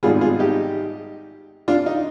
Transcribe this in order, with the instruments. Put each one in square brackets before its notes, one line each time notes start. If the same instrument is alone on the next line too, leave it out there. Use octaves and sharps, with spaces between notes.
[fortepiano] G#1 G#2 G3 B3 F4 G#4
F4 G#4
D#4 G4
D4 F4
D#4